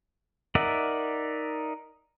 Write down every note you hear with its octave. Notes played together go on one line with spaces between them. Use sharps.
D#4 A#4 D5 E5 F#5